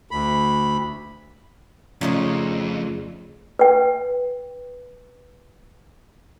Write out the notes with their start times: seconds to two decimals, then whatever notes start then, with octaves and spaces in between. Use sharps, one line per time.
0.11 D2 B5
2.01 F2 C#3 A3 D#4 F4 C#5 D5
3.59 B4 G5